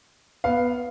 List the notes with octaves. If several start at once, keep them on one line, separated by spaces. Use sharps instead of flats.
B3 F5